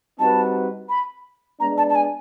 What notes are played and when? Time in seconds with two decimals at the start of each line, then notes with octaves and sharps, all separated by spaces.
0.18 G3 C4 D#4 F#4 B4 A5
0.89 B5
1.60 G#3 B3 D4 A#5
1.77 A5
1.89 A5
1.95 G#5